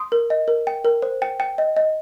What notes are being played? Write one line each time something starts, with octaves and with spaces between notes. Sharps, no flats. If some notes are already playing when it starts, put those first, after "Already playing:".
Already playing: C6 D#6
A#4
D#5
A#4
G5
A#4
C5
G5
G5
D#5
D#5